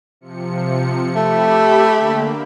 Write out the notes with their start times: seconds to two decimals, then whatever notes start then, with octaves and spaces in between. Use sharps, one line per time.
0.21 C3 F3 C#7
1.15 A3 G4 E5 B5
1.97 D3 A#3